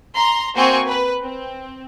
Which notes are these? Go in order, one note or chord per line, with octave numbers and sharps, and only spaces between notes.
A#5 C6
A#3 C4 F#4 C5 G#5 C#6
B4
C4